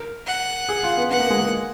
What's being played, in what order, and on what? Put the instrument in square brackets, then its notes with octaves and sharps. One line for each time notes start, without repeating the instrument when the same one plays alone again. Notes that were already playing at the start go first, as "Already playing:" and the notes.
Already playing: [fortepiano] A#4
[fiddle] F#5
[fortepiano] G#4
F4
B3
[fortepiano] B3 [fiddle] F#5
[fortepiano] A#3
G#3
A#3